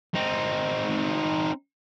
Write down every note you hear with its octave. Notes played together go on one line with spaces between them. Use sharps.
C4 D#4